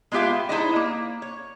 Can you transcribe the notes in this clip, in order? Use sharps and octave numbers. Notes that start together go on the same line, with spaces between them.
G#3 B3 F4 G4 E5 F5
D#4 E4 G#4 C5 D5 D#5
A#3
C#5